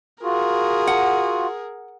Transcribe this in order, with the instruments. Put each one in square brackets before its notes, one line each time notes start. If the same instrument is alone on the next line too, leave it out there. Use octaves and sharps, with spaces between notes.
[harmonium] F4 F#4 [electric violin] G#4 A#4
[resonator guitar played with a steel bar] F#5